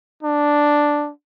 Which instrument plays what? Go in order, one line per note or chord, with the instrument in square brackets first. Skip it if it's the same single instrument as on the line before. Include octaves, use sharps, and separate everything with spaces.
[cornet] D4